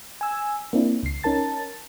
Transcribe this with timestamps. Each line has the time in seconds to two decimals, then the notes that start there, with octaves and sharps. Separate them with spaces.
0.21 G#5 E6
0.73 A#3 C4 D4 E4
1.03 C#2 C7
1.23 C#4 D#4 A#4 A5 A6